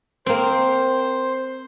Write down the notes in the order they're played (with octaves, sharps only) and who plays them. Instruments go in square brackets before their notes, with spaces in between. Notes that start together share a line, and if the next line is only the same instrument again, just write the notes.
[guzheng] A#3 C4 [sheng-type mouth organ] C5